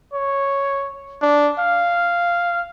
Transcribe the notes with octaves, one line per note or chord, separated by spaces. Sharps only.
C#5
D4
F5